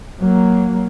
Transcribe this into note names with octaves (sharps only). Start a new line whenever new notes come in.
F#3 A#3